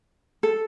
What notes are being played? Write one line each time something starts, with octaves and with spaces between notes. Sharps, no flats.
A4